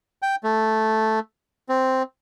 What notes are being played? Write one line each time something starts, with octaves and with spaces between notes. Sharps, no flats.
G5
A3
C4